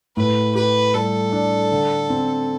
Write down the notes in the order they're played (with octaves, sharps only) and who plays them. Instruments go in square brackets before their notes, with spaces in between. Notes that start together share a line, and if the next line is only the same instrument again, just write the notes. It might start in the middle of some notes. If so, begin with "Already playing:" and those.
[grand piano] A2 [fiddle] B4
[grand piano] G4 [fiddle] B4
[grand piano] G3 [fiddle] A4
[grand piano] D4
D3
C4